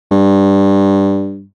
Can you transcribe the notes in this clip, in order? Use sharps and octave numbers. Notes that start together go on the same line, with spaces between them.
G2